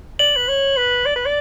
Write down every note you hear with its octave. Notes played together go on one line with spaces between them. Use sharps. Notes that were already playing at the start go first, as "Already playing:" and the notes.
D5 F#7
B4
C#5
B4
D5
B4
D5